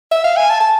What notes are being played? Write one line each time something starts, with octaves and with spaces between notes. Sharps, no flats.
E5
F5
G#5
A5
A5